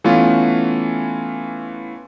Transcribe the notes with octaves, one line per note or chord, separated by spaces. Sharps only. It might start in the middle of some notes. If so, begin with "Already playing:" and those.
E3 A3 B3 C#4 F4